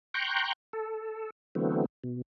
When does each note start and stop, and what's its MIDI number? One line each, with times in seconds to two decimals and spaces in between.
0.14 0.53 79
0.14 0.53 82
0.14 0.53 84
0.14 0.53 85
0.14 0.53 90
0.14 0.53 91
0.73 1.30 69
1.55 1.85 50
1.55 1.85 52
1.55 1.85 54
1.55 1.85 57
1.55 1.85 59
1.55 1.85 60
2.04 2.22 47